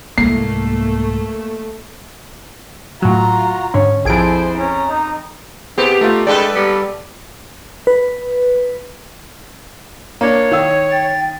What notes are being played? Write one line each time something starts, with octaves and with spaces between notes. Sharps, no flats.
C2 G#2 A3 A#3 C7
A2 F#3 F4 F#4 A#5
G#2 D3 C#4 C#5
A#1 F2 E4 G#4 A4 C5 G#5 D7
C#4 A#5
D#4
C3 B3 G4 G#4 C5
A3 D#4 F4
G2 G#3 D4 A4 B4 D5
G3 B3
B4
A#3 D4 C#5
D#3 F5 E6
G5 A6